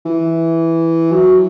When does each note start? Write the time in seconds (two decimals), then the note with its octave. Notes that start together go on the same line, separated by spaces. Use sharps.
0.05 E3
1.12 F#3